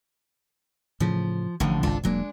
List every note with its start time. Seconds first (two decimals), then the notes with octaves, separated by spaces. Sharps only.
1.00 A2 C#3 F3
1.60 A1 A2 D3 F3
1.83 G#1 C#2 D4 F4 A4
2.04 E1 F#3 G#3 A#3 D4